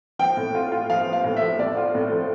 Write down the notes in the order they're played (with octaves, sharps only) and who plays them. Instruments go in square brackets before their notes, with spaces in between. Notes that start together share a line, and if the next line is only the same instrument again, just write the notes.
[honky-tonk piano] F3 [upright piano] G5
[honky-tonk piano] A2
F4
F4
[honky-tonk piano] F3 [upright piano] F5
[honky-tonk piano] F3
[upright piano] F5
[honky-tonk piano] A2
[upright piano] E5
[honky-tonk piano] F3
[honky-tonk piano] A2 [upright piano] D5
[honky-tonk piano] F4
A2
F3